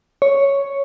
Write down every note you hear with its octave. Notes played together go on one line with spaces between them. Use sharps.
C#5